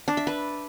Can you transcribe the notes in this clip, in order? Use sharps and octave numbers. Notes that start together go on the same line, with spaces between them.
D4
E5
B4